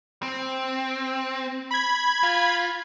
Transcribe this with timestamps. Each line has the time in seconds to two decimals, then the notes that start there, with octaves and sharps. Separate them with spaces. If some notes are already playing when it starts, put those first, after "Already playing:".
0.23 C4
1.71 B5 G#6
2.23 F4